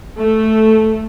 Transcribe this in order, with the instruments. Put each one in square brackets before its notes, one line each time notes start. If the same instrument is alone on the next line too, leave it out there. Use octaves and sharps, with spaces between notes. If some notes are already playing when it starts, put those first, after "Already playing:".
[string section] A3